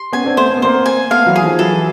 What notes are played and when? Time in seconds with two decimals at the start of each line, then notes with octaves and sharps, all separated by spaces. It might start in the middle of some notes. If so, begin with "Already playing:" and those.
Already playing: C6
0.12 B3 C#4 G#5
0.25 C4 D4
0.37 A3 B3 C5
0.50 C4
0.57 B3
0.62 A#3 C4 C5
0.86 G#5
1.11 A3 B3 F5
1.26 E3 F#3
1.36 G#4
1.43 D#3 F3
1.59 E3 F#3 A4